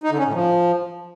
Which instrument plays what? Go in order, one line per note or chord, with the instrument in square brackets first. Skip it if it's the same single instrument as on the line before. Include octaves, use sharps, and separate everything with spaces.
[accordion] D#4
D3
C#4
A2
F3